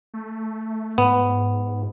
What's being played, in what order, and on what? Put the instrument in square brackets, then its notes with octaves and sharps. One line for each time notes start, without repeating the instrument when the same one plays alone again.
[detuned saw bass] A3
[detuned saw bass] G#2 [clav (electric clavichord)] B3